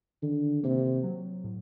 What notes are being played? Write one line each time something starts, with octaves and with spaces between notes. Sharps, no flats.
D3 D#3
C3 A#3
F#3
A2